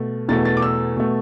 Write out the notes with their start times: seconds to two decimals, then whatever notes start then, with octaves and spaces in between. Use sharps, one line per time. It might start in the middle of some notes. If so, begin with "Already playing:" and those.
Already playing: B2 A3
0.29 E2 B2 A3 A6
0.45 A6
0.57 D6
0.62 E6
0.97 B2 A3